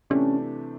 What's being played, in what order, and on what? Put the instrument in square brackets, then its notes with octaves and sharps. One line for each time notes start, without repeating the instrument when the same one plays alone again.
[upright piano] C3 E3 A3 D4 G4 [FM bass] C#4